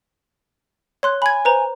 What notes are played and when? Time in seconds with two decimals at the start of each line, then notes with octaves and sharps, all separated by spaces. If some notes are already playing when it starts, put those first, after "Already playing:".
1.03 C#5 C6 F#6
1.22 G#5 B5 G#6
1.45 B4 C5 A#5